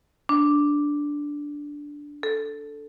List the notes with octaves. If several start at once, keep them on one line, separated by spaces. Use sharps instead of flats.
D4
A4